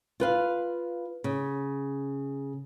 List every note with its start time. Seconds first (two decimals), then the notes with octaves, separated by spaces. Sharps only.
0.20 F4 B4 F5
1.24 C#3